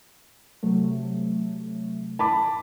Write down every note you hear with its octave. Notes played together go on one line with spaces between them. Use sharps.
C3 F#3 A3
A5 B5 D6